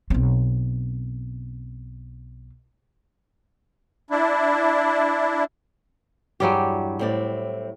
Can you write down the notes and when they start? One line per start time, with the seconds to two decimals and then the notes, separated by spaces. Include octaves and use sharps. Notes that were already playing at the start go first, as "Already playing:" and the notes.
0.10 B1 C4
4.10 D4 E4
6.40 E2 G2 F#3 G3 G4 G#4
6.99 A2 C4 D5